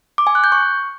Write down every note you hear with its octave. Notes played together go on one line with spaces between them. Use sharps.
D6
G#5
F#6
G6
C#6